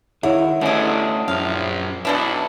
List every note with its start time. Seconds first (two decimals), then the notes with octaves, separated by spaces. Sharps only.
0.23 C#2 D#3 F#3 E4 C#5
0.61 G1 B2 A3 C#4 D4 G#4
1.28 A#1 F#2 F5
2.05 B1 E3 D4 E4 A4